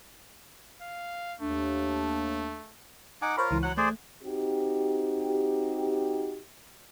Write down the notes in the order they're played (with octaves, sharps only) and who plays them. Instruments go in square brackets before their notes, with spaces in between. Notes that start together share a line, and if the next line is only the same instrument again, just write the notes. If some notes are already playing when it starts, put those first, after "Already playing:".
[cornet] F5
[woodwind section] D#2 D4 [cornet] A3
[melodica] D#4 F#5 D6 [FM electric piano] G#5
[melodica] F4 A#4 [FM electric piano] C5 C#5 B5
[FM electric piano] C#2 E3
[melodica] F#3 F#5 [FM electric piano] F#6
[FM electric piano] A3 [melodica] G#4 C5 D5
[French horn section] C4 D#4 F#4 G4